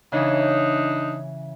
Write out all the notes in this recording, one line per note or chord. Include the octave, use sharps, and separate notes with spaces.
C#3 E3 D4 D#4